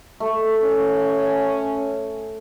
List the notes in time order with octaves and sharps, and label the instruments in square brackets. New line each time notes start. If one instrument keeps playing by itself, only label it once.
[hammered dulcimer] A3
[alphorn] C#4